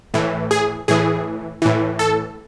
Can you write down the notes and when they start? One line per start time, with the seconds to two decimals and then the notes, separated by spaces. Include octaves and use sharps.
0.14 A2 E3
0.51 G#4
0.88 A2 E3 G#4
1.62 A2 E3
1.99 A4